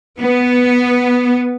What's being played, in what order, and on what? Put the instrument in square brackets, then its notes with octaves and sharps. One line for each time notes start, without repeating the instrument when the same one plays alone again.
[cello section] B3